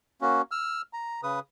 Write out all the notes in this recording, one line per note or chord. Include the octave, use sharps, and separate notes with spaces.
A#3 C#4 F#4
E6 F6
A#5
C#3 B4 D#6